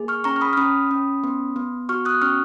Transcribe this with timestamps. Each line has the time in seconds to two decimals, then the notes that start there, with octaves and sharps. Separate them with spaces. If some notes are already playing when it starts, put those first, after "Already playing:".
Already playing: A#3 G#4
0.08 C#6 F6
0.24 C#4 A#5 C#6
0.36 F6
0.41 B5 D#6
0.53 F6
0.57 C#4 B5 D#6
0.91 C#4
1.24 B3
1.56 B3
1.89 F#4 C#6 F6
2.05 D#6 F#6
2.22 C#4 C#6 F6